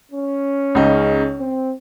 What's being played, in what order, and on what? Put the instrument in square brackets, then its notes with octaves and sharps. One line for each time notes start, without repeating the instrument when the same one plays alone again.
[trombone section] C#4
[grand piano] C#2 C#3 G#3 D#4
[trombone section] C4